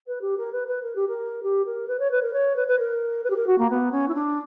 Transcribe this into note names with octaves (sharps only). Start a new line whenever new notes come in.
B4
G4
A#4
B4
B4
A#4
G4
A#4
G4
A#4
B4
C#5
B4
A#4
C#5
B4
B4
A#4
B4
G4
A#4
F#4
A#3
B3
C#4
E4
D4